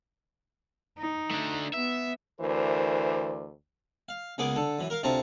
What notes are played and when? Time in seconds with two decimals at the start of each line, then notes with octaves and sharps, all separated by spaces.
0.98 D#4
1.31 A3 D4
1.73 B3 E5
2.41 D2 E3 A#4 C5 D5
4.09 F5
4.38 C#2 A#3 B3 G#4 D6
4.56 D3 A4
4.79 F#2 E3
4.90 A#4 F5
5.03 D2 C3 C4 F4 A5 A#5